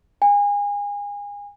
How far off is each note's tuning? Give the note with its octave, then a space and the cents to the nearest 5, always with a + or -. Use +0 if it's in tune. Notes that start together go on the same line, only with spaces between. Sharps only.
G#5 -30